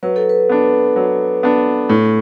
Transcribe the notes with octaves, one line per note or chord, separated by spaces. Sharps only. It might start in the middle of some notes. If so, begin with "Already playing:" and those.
F#3 B4
A4
B4
B3 D4
F#3
B3 D4
A2 A4